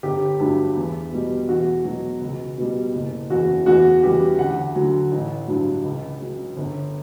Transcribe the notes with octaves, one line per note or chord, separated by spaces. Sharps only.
G1 G4
G2 F#3
E2
B2 G3
E2 F#4
B2 F#3
C#2
B2 G3
F#1
E2 C#3 F#4
E2 F#4
C#3 E3 G3 G4
D2 F#5
D3 F#3
A1
G2 F#3
C#2
C#3 F#3
G1